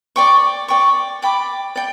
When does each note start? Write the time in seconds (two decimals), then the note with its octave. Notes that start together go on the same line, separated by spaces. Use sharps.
0.16 D5 G5 C#6
0.68 D5 G5 C#6
1.22 D5 G5 B5 D6
1.76 D5 G5